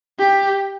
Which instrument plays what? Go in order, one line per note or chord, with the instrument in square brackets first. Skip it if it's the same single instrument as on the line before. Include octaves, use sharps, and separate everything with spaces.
[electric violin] G4